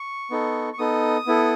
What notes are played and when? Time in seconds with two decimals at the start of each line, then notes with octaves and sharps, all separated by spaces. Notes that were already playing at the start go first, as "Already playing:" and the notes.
Already playing: C#6
0.31 B3 D#4 A4
0.73 C#6
0.79 B3 D#4 A4 D#6
1.27 B3 E4 A4